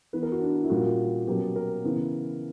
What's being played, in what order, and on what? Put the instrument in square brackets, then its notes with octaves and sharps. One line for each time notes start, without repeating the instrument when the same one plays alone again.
[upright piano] E3 B3 B4
A#4
F#4
D4
E4
A#2 G3 A#3 C#4 F#4
B2 F#3 A#3 C#4 G4
A#4
C#3 E3 B3